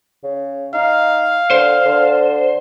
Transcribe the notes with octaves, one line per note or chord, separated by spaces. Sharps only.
C#3
D#4 F5
D3 C5
D3